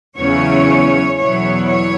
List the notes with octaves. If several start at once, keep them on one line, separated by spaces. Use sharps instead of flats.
E2 C#3 F#3 C#4 E4 C#5
E2 B2 F#3 B3 E4 C#5
C#5